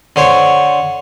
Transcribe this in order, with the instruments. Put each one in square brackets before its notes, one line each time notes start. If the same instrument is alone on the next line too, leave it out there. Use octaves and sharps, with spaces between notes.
[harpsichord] D3 C5 C#5